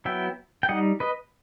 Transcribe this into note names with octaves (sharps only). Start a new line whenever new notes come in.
F#3 B3 E4 E5 G5
G5
G3 D#4 D#5 F#5
B4 D#5